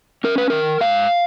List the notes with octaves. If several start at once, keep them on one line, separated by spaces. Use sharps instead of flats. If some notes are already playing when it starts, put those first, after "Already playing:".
C#4 A#4
B4
D#3 A#4
G#2 F5